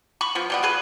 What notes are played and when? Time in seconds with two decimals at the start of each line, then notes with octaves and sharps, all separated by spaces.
0.21 B5 C#6
0.35 F3 B3
0.50 B2 G3 B3
0.63 F3 G#4 B4